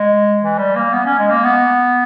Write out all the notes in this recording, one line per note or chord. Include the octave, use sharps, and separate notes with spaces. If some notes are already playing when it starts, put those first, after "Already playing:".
Already playing: G#3
E3
G3
A#3
B3
C#4
G#3
A#3
B3